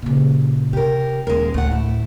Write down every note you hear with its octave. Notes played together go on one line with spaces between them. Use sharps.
A#2 C#3
C3 G4 A#4
D#1 G#3 A#4
D2 A2 A3 F#5
E4